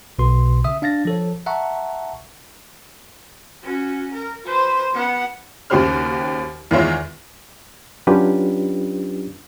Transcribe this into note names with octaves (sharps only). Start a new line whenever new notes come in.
B1 B2 F#4 B4 C6
C#3 E5 D#6
D4 F5 A6 A#6
F3 A4 C#5
E5 F#5 A5 A#5 C#6
C#4 F#4
A#4
B4 C5
B3 F#5
D#2 C#3 F#4 G4 C5 F6
E2 D#3 G#3 F4 C#5 E5
F#3 C#4 D4 F4 G4 B4